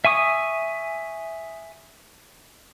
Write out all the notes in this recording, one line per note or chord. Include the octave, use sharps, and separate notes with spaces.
E5 G#5 C#6 D#6